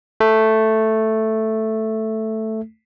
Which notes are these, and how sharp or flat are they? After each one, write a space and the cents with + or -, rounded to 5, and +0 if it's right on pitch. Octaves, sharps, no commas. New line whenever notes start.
A3 +0